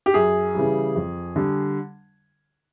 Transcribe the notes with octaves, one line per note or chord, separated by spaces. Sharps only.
G4
F#2 G#4
C#3 E3 G3
F2
D3 G3